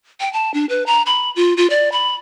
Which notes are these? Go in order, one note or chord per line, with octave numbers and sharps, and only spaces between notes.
G5
A5
D4
B4
A#5
B5
F4
F4
D5
B5